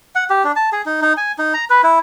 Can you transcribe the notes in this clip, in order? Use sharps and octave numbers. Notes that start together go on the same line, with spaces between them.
F#5
G4
D4
A5
G#4
D#4
D#4
G#5
D#4
A#5
B4
E4